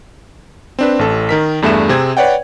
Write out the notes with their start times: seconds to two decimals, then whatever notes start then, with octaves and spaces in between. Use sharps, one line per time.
0.79 C4 D4 B4
0.99 A1 A4
1.29 D#3 A#4 B6
1.62 E2 G2 A3 G#4 E5 E7
1.89 C3 C4 G#4 G#6
2.17 B4 C#5 D5 F#5 G5